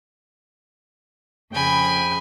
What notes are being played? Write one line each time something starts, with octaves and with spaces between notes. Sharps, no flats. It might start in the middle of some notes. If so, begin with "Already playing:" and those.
F2 C#3 G5 G#5 B5